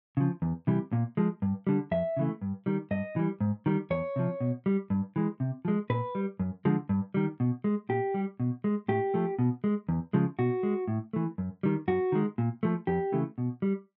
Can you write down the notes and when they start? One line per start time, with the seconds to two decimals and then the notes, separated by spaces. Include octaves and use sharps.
0.17 C#3 F3
0.42 E2
0.67 C3 E3 G3
0.93 A#2
1.17 F3 G#3
1.42 G2
1.67 D3 G3
1.91 F2 E5
2.17 C#3 E3 A3
2.42 G2
2.66 D#3 G3
2.91 G2 D#5
3.16 E3 G3
3.41 G#2
3.66 D#3 G3
3.91 E2 C#5
4.16 C3 F3
4.40 B2
4.66 G3
4.90 G2
5.16 E3 G#3
5.40 C3
5.65 F3 G#3
5.90 A#2 B4
6.15 G3
6.40 F#2
6.65 D3 F3 G#3
6.89 G2
7.14 D#3 G3
7.40 B2
7.64 G#3
7.89 A#2 G4
8.14 G3
8.40 B2
8.64 G#3
8.88 A2 G4
9.14 F3 A3
9.39 B2
9.64 G#3
9.89 E2
10.13 C#3 F3 G#3
10.39 B2 F#4
10.63 G#3
10.88 A2
11.13 E3 A3
11.38 F#2
11.63 D#3 G3
11.88 F#2 F#4
12.12 D#3 G#3
12.38 A#2
12.63 F3 A3
12.87 F2 G4
13.12 C#3 E3 A3
13.38 B2
13.62 G3